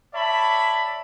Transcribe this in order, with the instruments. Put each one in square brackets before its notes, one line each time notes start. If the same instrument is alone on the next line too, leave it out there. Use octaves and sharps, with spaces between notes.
[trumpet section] C#5 D5 E5 A5 B5